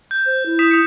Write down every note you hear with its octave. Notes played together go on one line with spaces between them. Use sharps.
G6
C5
E4
D#6 B6 E7
D#6 B6 C#7